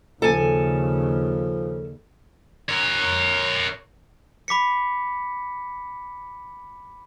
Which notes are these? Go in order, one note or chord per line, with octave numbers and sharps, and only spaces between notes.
D#2 C#3 F3 A4 G#5
A#4 C#5
B5 D6 B6 C#7